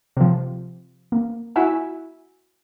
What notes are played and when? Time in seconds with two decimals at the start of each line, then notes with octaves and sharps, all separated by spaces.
0.17 C3 F3
1.12 A#3
1.56 E4 F#4 E5 G#5